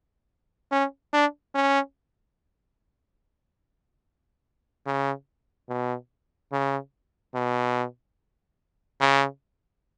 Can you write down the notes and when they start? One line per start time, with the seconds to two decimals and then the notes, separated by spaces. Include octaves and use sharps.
0.72 C#4
1.13 D4
1.55 C#4
4.86 C#3
5.69 B2
6.52 C#3
7.35 B2
9.01 C#3